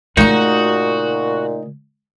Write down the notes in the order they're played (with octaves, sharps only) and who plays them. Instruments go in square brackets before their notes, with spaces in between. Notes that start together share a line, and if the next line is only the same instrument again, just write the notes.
[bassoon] A#2 [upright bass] C#3 A3 [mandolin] D#4 C#6 [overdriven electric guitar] F#4